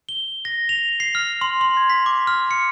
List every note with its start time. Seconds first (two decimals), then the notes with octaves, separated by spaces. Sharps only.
0.09 G7
0.45 A#6
0.69 F7
1.00 C7
1.15 F6
1.41 C6
1.61 C6
1.77 G#6
1.90 B6
2.06 D6
2.27 F6
2.51 C#7